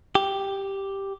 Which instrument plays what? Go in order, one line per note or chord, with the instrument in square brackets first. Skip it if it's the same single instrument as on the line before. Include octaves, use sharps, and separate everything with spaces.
[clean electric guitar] G4